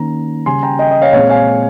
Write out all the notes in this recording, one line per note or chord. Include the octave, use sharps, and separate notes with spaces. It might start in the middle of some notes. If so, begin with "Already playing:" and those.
Already playing: D#3 A#3 C#4 A#5
C#3 G3 C#4 G#5 C6
G5 A#5
D#5 G5
D#5
C#5 F5
A#2 G#3 C4 C#5 F5
F5 G#5